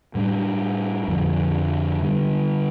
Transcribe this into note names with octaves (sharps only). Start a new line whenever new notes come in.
A2 G3 D4
F2 D3 F3 D4
D3 G3 D4